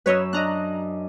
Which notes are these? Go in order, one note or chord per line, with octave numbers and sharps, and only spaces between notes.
F#2 C#4 B4 C#5 D#5 E6
D4 D#5 A#5 F#6